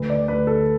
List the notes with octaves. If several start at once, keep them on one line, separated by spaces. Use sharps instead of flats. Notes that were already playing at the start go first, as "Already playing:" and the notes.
Already playing: D2 B4
D5
D2 B4
A4